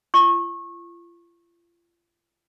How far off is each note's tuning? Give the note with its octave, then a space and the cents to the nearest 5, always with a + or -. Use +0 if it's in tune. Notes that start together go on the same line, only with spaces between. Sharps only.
F4 -40 C#6 -25